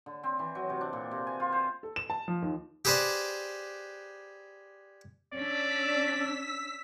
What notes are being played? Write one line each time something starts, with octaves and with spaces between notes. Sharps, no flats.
D3
C4
E3
F#3
C3
D4
A#2
C3
G#5
F4
C5
A4
E7
A5
F3
D#2
G4 G#4 B4 C5 D5
C#4 D4 D5 E6 B6